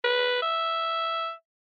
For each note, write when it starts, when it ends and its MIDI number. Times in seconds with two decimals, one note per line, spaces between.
0.04 0.41 71
0.42 1.32 76